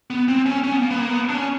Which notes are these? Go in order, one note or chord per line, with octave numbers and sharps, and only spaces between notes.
B3
C4
C#4
C#4
B3
A#3
B3
A#3
B3
D4
C#4